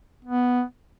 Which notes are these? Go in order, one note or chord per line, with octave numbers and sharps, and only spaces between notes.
B3